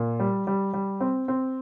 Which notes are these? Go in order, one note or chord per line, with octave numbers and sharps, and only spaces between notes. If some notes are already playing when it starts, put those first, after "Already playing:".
Already playing: A#2
G3
G3
G3
C4
C4